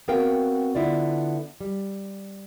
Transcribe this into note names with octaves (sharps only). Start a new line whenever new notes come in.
B3 C4 F#4 A#4 F5 G5
D3 B3 E4 F4 D5
G3